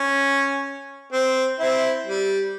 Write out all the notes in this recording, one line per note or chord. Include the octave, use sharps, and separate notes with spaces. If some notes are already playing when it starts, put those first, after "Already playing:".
Already playing: C#4
C4
C4 E4
G3